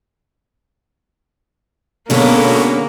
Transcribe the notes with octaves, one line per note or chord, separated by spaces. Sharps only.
B2 D3 G#3 A#3 B3 C#4 A4 C#5